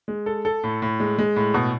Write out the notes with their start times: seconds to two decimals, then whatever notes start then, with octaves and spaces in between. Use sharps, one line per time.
0.08 G#3
0.26 A4
0.45 A4
0.64 A2
0.82 A2
1.00 G#3
1.18 G#3
1.36 A2
1.54 B2